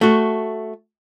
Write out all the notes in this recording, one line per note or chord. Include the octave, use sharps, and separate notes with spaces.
A3 F#4